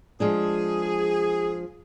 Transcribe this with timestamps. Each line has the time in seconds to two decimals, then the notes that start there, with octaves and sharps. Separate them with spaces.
0.20 F3 G#3 D4 G#4